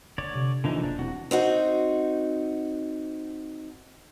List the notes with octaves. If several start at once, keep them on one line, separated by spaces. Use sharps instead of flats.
D3 A#3 C#5 D5
C3
A#1 D3 E3 D#4
E1 A#3 D4
C2 F#4
C4 D#4 F#4